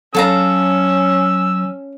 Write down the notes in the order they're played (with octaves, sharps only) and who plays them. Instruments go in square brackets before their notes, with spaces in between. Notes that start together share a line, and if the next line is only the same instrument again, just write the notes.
[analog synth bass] F#3 [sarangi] C#4 [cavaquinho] A4 F5 A#5 [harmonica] E6